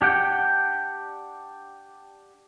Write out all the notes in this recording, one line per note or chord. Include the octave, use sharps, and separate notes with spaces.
D4 G4 F#5 G5